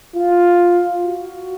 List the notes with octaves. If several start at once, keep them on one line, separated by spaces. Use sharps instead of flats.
F4
F#4